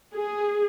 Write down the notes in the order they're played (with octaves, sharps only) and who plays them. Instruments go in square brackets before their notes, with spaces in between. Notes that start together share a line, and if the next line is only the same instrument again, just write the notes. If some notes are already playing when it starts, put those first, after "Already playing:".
[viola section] G#4